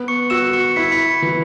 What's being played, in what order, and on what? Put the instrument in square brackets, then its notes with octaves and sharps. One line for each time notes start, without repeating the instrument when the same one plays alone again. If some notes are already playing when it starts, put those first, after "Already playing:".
Already playing: [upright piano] B3
[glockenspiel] C#6 C#7
[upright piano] F#4 [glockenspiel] E6 E7
[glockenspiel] C#6 C#7
[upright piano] E4 [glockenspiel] B6
[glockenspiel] C#7
B5 B6
[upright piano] E3